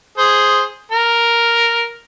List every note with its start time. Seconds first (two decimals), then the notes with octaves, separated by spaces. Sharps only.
0.18 G#4 C5
0.91 A#4